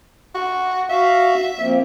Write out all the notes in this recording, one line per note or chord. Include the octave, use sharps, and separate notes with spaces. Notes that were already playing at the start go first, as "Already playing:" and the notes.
F#4
F#4 E5 F5
F3 A#3 C4